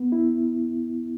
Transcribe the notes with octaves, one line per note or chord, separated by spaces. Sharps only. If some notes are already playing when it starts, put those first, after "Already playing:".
Already playing: B3
E4